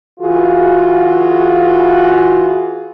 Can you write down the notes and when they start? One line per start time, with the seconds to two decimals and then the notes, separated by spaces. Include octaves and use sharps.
0.20 E3 F4 F#4 G#4